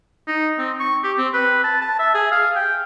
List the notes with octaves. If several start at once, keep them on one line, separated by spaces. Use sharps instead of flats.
D#4
C4
C#6
G4
C4
B4
A5
A5
E5
G#4
F5
G5